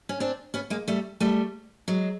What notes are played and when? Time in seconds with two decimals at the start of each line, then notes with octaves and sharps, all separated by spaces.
0.09 C#4
0.20 C4 D4
0.54 B3 C#4
0.70 G#3 A#3
0.88 G3 A3
1.20 G3 A3
1.88 F#3 G#3